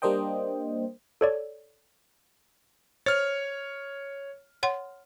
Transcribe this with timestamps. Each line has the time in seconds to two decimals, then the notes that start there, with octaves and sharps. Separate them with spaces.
0.02 G3 A#3 D4 C5 D#5 G5
1.21 A4 C#5 D5
3.06 C5 C#5 F6
4.63 C#5 F#5 C6